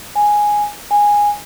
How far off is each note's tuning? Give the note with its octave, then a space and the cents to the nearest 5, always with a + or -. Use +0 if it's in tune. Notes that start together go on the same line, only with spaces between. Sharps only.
G#5 +0
G#5 -10